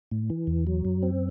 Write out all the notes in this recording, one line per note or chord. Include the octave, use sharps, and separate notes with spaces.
A2
E3
E2
F#3
F#2
C4